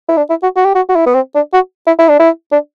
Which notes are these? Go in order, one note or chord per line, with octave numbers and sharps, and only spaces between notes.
E4
D4
E4
F#4
F#4
G4
F#4
F#4
E4
B3
C4
D4
F#4
E4
E4
D4
E4
D4